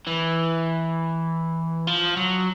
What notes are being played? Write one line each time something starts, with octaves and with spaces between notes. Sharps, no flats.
E3
F3
F#3